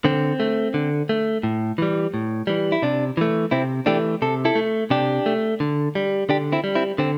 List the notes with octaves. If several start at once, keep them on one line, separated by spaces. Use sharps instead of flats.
D3 C4
A3
D3
A3
A2
E3 G3
A2
E3 G3
E4
C3 D4
E3 A3
C3 C4 E4
E3 A3 D4 G4
C3 A4
E4 A4
A3
C3 D4 G4
A3
D3
G3
D3 D4 G4
C4 E4
G3
C4 E4
D3 C4